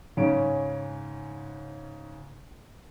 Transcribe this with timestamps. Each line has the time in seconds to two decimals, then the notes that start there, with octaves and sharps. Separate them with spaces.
0.17 G#2 C#3 C#4 D7